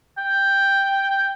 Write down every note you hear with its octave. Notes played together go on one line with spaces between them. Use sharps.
G5